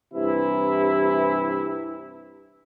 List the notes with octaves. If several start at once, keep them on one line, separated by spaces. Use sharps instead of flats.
G2 C3 E3 E4